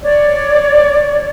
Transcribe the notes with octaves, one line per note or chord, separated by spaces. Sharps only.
C#5 D5